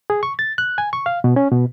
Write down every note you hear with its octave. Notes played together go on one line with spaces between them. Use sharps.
G#4
C#6
A6
F#6
G#5
C#6
F5
B2
C#4
B2